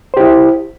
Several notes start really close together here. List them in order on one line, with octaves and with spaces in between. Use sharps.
C5 G4 E4